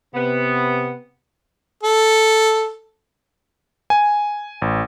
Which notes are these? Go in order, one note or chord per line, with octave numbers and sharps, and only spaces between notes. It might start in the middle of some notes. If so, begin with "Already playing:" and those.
C3 B3
A4
G#5
A1